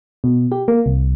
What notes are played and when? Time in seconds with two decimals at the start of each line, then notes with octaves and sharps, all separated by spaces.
0.24 B2
0.52 G4
0.68 A#3
0.86 C2